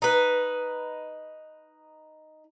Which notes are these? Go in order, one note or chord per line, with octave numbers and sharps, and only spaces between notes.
D#4 B4